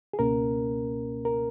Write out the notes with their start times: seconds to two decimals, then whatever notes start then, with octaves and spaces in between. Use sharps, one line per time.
0.13 G#4
0.19 C#2 B2 A#3 C#4 A#4
1.25 A#4